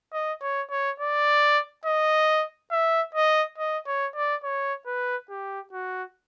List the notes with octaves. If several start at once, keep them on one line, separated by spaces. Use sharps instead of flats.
D#5
C#5
C#5
D5
D#5
E5
D#5
D#5
C#5
D5
C#5
B4
G4
F#4